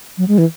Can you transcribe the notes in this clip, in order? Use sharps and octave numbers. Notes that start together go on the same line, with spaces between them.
F#3
G#3
E3